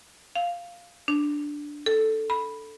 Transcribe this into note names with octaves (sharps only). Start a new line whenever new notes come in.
F5
D4
A4
B5